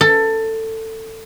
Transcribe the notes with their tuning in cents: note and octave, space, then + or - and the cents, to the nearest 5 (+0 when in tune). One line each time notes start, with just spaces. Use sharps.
A4 +20